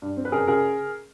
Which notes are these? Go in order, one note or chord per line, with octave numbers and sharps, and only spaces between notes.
G2
C4
B4
F#1 G#4 A#4
C#3 G#4 A#4